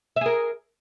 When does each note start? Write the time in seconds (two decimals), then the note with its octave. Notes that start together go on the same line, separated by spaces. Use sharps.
0.16 E5
0.21 G#4
0.26 A#4